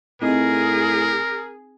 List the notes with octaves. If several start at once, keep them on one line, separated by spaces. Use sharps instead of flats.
A2 C4 D#4 G#4 A#4 D#5